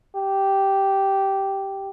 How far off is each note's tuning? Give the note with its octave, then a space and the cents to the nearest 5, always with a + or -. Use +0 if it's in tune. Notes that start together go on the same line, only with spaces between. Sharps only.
G4 -5